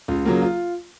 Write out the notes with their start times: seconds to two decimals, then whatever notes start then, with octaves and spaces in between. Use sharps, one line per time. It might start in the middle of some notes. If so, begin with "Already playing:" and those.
0.08 C#2 F4
0.25 C#3 F#3 A#3 F4
0.42 F4